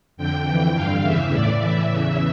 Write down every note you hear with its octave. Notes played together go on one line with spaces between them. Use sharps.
F2 D3 G5
F2 E3
G2 D3 F5
E2 C#3 E3 E5
A2 E3 D5
A2 E3 E5
E2 C#3 E3